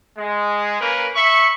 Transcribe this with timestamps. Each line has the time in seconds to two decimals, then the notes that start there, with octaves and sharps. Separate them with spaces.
0.17 G#3
0.80 A#3 C#4 A#4 B4
1.15 E5 B5 C#6